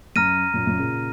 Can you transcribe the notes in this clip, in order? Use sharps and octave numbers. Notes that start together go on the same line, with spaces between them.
F#2 A#5 F6 A#6 D#7
F#2 A#2
F#2 A#2
A#2 C#3